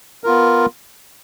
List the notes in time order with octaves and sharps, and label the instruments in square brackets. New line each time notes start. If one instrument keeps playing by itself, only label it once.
[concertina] B3 F4 A#4